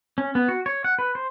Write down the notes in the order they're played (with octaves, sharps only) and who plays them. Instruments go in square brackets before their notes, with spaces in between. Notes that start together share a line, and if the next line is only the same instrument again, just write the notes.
[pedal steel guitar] C#4
B3
F#4
C#5
F#5
B4
C5